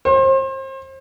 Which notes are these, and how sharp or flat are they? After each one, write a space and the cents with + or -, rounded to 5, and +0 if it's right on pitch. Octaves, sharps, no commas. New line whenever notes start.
C5 +35